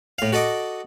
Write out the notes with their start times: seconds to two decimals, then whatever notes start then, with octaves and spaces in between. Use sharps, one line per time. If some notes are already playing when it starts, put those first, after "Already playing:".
0.19 A2 F5
0.32 F#4 A4 D#5 D6